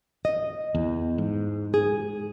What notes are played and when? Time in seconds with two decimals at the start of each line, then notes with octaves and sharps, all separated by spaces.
0.25 D#5
0.75 E2
1.18 G#2
1.74 G#4